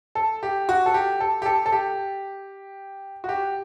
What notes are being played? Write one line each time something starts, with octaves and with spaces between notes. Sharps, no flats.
A4
G4
F#4
A4
G4
A4
G4
A4
A4
G4
F#4
G4